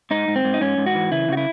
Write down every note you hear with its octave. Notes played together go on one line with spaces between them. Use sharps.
G#2 D#4
G#2
C4
G#2
D#4
G#2 C#4
G#2
F#4
E3
C#3 E4
C#3 F#4
E4